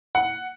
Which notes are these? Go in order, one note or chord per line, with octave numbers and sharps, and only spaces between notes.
F#5